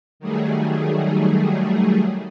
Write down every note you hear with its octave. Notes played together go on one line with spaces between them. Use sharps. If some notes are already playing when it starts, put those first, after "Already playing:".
D#3 F#3 G3 A3 G#4